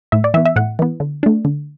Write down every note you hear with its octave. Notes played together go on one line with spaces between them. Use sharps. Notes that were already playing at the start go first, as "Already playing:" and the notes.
A2 E5
D5
E3 B3 E5
E5
A2 F#5
E3 B3
D3
A3 D4
D3